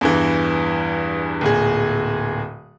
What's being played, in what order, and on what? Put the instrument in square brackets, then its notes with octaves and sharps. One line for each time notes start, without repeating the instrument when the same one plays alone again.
[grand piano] E2 G2 E3
D1 A#2 G#4